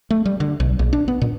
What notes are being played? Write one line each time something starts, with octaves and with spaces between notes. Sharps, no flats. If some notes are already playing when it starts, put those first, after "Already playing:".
A3
G3
D3
B1
A#1
D4
B3
A#2